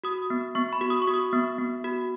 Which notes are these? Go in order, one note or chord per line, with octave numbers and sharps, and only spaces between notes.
F#4 D#6
B3
B3 C#6
B5
F#4
D#6
C#6
F#4
D#6
B3
B3
F#4